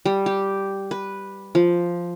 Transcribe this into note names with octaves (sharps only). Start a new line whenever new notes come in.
G3
G4
B4
F3